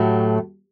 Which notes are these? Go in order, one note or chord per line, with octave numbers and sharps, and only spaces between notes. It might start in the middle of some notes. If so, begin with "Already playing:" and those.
Already playing: A2 F#3 A3 G4